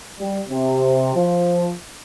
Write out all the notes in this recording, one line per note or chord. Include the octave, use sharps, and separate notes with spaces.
G3
C3
F3